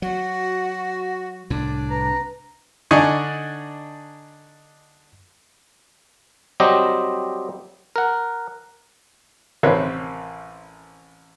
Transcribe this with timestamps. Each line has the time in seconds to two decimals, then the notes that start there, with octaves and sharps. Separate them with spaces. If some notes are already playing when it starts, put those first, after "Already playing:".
0.02 F#3 F#4 F#5
1.50 C2 A2 D4
1.90 B4 A#5
2.91 D3 D4 D#4 D#5 G#5 C#6
6.60 F#3 G3 C4 G4 D#5
7.96 A#4 F#5
9.63 A1 C3 D#3 C4 B4 C#5